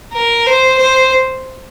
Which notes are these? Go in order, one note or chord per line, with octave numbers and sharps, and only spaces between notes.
A#4
C5
C5